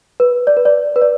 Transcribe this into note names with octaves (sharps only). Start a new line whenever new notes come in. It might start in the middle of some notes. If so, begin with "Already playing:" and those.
B4
D5
B4
D5
B4
D5